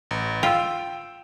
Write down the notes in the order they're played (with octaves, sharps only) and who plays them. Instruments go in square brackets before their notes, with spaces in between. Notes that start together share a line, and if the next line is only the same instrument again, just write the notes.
[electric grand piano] A1
[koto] F4 [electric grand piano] G5 E6